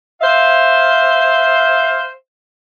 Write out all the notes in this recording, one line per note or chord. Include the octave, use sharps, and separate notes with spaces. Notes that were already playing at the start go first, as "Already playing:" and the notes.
C5 E5 F5